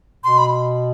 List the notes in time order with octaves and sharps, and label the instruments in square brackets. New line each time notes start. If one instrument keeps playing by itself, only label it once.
[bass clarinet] B2 [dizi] C6
[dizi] B5